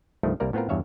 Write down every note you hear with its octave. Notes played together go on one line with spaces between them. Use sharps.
C2 G2 D#3 F3 A3
C2 G3 A#3 A#4 D5
A2 B3 C4 F4 A#4
E2 G2 C#5 E5 F5